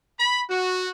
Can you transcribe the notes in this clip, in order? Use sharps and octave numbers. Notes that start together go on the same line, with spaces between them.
B5
F#4